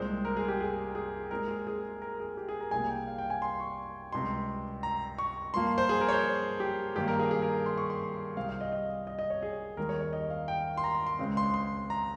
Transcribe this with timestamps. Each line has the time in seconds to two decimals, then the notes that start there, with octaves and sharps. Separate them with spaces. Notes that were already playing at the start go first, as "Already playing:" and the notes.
Already playing: C2 A#2 G#3 C4 C5
0.25 A#4
0.37 G#4
0.48 G4
0.61 G#4
0.95 G#4
1.31 A#2 G#3 C4 A#4
1.48 G#4
1.67 G#4
2.02 A#4
2.20 G#4
2.37 G4
2.49 G#4
2.61 A#4
2.71 C2 C3 G3 A#3 G#5
2.89 G5
3.07 F5
3.18 G5
3.30 G#5
3.42 C6
3.60 C#6
4.13 C#2 C3 G3 C6
4.83 A#5
5.18 C#6
5.54 G2 F3 A#3 C6
5.78 C5
5.89 G#4
6.01 A#4
6.08 C#5
6.12 C5
6.60 G4
6.95 G2 D#3 A#3 G4
7.08 A#4
7.20 G#4
7.31 G#4
7.42 A#4
7.66 C6
7.78 C#6
7.90 C6
8.36 C2 C3 G3 C4 F5
8.49 F5
8.61 D#5
8.72 D#5
9.07 D#5
9.19 D#5
9.30 C#5
9.43 G#4
9.77 D#2 D#3 G3 A#4
9.89 C#5
10.01 C#5
10.13 D#5
10.30 F5
10.48 G5
10.77 C6
10.84 A#5
10.95 C6
11.07 C6
11.19 C#2 C#3 G#3 C4
11.37 C6
11.54 C6
11.90 A#5